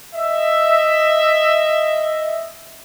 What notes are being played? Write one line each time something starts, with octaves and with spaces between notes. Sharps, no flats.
D#5 E5